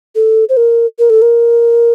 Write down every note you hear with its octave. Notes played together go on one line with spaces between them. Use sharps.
A4
C5
A#4
A#4
A4
A#4